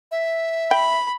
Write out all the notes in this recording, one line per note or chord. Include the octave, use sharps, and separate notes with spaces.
E5
G5 B5